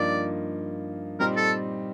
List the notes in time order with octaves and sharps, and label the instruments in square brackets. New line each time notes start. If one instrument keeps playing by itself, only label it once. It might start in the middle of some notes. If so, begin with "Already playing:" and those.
Already playing: [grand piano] G2 F3 A#3 D#4 [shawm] D5
[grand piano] A#2 G3 C4 D#4 [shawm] A#4
[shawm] A4